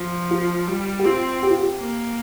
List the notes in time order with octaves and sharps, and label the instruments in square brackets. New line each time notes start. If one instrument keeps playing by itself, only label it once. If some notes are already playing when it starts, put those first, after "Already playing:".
Already playing: [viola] F3
[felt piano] F4
[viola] G3
[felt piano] G4
[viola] C4 [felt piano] F4
[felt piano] G4
F4
G4
[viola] A#3